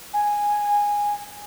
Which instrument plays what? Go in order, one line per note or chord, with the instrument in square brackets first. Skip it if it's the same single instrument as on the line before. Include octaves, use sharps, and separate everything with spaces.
[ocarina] G#5